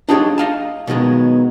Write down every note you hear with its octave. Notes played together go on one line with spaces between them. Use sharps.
D4 D#4 F4 G4 G#4 C#5
D#5 F5 A5
B2 D#3 F#3 G#3 B3